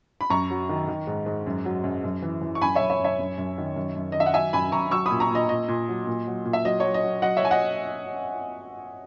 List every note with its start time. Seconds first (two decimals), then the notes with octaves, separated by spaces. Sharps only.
0.21 B5
0.30 F#2 A#5 C#6
0.50 F#3
0.69 D#3
0.88 D#3
1.07 G#2
1.26 G#2
1.47 F#2
1.65 F#3
1.84 F#2
2.04 F#2
2.22 E3
2.41 E3
2.55 C#6
2.61 F#2 G#5 B5
2.75 F#2 C#5 E5
2.90 C#5 E5
3.00 F#2 C#5 E5
3.20 F#2
3.38 F#2
3.58 D#3
3.76 F#2
3.96 F#2
4.12 D#3 D#5
4.20 E5
4.26 F#5
4.34 F#3 E5 G#5
4.53 F#2 G#5 B5
4.72 F#2 A#5 C#6
4.91 F#3 C#6 E6
5.06 A#2 B5 D#6
5.20 A#5 C#6
5.30 A#2 D#5
5.49 A#2 D#5
5.68 A#2
5.88 F#3
6.07 A#2
6.27 F#3
6.45 A#2
6.53 E5
6.65 F#3 D#5
6.80 F#3 C#5
6.94 D#5
7.03 F#3
7.22 F#3 D#5 F#5
7.37 C#5 E5
7.42 F#3 G#5
7.51 D#5 F#5